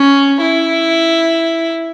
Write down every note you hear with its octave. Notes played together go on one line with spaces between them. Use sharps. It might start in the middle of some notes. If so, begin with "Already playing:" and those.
Already playing: C#4
E4